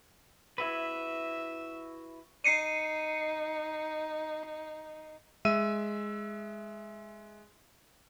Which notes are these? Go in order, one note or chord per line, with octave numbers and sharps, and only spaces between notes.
E4 F#4 B4 E5
D#4 C7 C#7 D#7
G#3 E5 E6 D#7